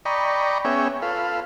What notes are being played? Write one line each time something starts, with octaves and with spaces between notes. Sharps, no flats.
D5 D#5 G5 A#5 B5 C#6
B3 C#4 G#4 C#5 E5 G5
F4 A4 B4 F5